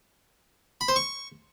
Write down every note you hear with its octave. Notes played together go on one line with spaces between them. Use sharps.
B5
C5
C#6